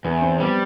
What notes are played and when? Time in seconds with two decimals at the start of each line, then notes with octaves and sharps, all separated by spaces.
0.04 E2 B3
0.22 C4
0.40 G3 B3